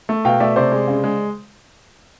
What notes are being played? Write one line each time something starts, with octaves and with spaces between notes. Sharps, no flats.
A3
B2 F5 G5
A3 D5 E5
C3 C5 D5
G#3
C#3
G#3